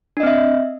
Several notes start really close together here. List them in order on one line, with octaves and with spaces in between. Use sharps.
D4 D#5 C4 E5